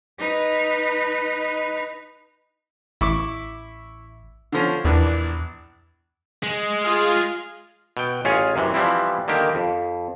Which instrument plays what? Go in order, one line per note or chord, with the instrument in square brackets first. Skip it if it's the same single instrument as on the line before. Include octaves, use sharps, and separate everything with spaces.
[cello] D#4 B4
[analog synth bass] A1 [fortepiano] E4 C#6 D6
[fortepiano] D3 F3 C#4
[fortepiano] A#1 E3 D4 [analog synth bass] E2
[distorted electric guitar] G#3
[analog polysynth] F4 G#4 F6
[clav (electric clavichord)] B2 G5
A1 C#4 F4 G#4 C#5 G#5
F#2 C3 E3
E3 F3 G3 C4 E4
D3 D#3 A#3 G4
F2